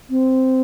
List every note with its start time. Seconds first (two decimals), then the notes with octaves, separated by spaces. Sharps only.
0.10 C4